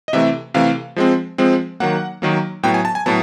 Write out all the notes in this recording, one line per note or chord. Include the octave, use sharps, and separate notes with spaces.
D#5
C3 E3 A3 E5
C3 E3 A3 F5
F3 G#3 C4
F3 G#3 C4
D#3 F#3 A#3 F#5
D#3 F#3 A#3
A2 F#3 B3 G5
G#5
A5
G#5
A2 F#3 B3 A5